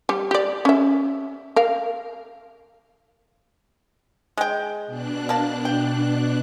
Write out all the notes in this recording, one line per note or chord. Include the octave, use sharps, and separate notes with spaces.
G3 G4
G4 D5
C#4 E5
A#4 F5
G#3 G5
B2 D4 F#6
A#3 A5
G5